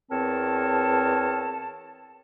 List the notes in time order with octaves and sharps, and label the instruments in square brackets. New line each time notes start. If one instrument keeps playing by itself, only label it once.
[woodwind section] E2 C4 A#4 C#5 A5